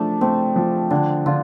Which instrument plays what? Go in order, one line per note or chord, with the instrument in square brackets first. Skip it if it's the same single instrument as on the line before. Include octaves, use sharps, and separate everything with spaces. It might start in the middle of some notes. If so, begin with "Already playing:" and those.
Already playing: [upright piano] F3 A3 [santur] D4
[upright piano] A3 [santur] C4
[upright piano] F3
[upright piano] D3 [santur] D4
[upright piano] D3 [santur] F4